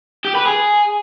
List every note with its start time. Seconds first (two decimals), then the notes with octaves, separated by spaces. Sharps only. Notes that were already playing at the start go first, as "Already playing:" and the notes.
0.25 G4
0.35 B4
0.46 G#4